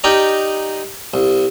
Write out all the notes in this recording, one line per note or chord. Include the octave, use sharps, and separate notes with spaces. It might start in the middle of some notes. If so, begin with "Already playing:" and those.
D#4 G4 A#4 D5 D#5 A#5
C2